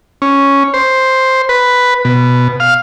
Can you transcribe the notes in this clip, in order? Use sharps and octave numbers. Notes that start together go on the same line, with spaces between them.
C#4
C5
B4
B2
F5